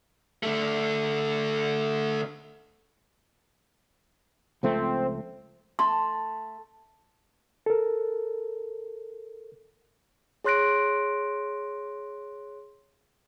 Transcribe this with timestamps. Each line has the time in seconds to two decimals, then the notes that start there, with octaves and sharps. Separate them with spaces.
0.43 D3 A3
4.63 C#2 F3 A3 C4
5.79 A3 C6
7.66 A4 A#4
10.44 G#4 C#5 C6 F#6 A#6 D7